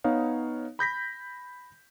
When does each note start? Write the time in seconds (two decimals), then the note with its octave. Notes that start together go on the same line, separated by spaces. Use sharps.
0.04 B3 D#4 C#5 F5
0.79 B5 G6 A#6 B6